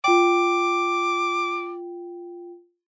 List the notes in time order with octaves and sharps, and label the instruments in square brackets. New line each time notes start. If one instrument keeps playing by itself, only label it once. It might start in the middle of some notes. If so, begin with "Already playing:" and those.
[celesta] F4 G5 [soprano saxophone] D6